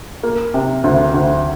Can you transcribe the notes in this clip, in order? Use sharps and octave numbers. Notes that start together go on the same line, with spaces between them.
A#3
C3
D2
D2